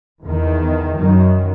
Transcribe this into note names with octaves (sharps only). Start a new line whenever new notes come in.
E2 D#3
F#2 D#3